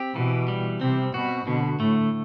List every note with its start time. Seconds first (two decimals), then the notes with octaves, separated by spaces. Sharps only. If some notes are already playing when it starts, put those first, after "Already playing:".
Already playing: C4 G4
0.15 B2 E3
0.48 G3
0.81 C3 C4
1.14 B2 F#4
1.47 B2 D3
1.80 A2 A3